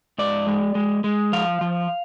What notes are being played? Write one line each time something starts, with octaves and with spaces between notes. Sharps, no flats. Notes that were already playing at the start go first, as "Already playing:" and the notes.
G#2 D5
G#3
G#3
G#3
F3 F5
F3